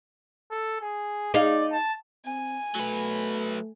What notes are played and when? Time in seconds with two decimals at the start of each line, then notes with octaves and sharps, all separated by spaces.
0.51 A4
0.81 G#4
1.34 D#4 G#4 D5 F5
1.72 A5
2.25 C4 G#5
2.75 F#3 A3 B4